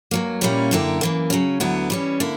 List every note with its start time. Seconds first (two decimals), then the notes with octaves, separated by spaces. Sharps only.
0.11 G2 F#3 A#3
0.41 A#2 G3 A#3 C#4 E4
0.71 F#2 D3 A#3 E4 G4
1.01 F#2 E3 A#3
1.30 C#3 F#3 C#4
1.60 D2 D3 F#3 B3 E4
1.90 E3 G3 C#4
2.20 D3 A#3 E4